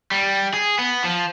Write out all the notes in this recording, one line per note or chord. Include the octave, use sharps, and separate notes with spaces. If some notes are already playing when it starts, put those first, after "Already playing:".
G3
G#4
B3
F3